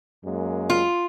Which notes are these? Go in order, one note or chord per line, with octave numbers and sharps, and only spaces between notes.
F#2 G#3 A#3
F4